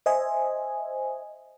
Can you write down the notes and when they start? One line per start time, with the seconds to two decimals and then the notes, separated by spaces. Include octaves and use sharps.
0.06 C5 D#5 E5 G#5